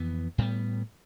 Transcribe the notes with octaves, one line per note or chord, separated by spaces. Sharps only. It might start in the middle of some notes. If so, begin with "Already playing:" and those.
Already playing: F2 E3 B3
A2 G3 B3